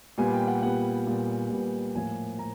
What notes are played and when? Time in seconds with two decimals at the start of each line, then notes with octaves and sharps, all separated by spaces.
0.18 A#2 G3 B3 G#5
0.33 G5
0.48 F#5
0.62 A#2 G3 B3 F#5
1.07 A#2 G3 B3
1.50 A#2 G3 B3
1.95 A2 F3 A#3 G#5
2.39 A2 A#5